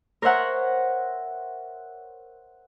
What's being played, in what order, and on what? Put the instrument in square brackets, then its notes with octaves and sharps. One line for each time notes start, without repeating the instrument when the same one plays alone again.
[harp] A#4 C5 C#5 E5 F#5 A#5